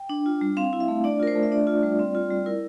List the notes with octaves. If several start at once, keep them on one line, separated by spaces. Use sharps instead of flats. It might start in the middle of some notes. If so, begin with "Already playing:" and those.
Already playing: G5
D4
F4
G3
C4 F5
E4
E5
A3
D4 D5
F4 A#4
C5
A3
E5
D4 D5
F4
G3
C4
F4
G3
E4 A#4